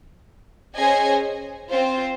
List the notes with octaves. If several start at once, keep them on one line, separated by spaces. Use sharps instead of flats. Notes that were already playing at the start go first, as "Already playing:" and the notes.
C#4 G#4 C5 D#5 G#5
C4 F4 C5